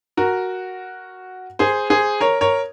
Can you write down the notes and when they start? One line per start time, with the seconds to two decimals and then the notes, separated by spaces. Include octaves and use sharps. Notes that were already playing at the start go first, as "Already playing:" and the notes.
0.17 F#4 A#4
1.59 G#4 C5
1.90 G#4 C5
2.21 A#4 C#5
2.41 A#4 C#5